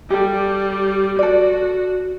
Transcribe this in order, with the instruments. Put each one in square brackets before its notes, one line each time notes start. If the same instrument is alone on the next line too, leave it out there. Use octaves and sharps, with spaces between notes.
[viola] G3 [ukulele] G4 A4
[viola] F#4 [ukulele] A4 D5